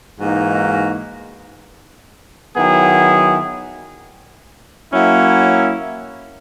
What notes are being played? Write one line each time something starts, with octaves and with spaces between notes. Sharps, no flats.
G#2 E3 A#3 D#4 F#4
D#3 F#3 B3 E4 G#4
F#3 A#3 C#4 E4